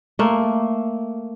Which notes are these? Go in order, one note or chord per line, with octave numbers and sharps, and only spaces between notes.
A3 A#3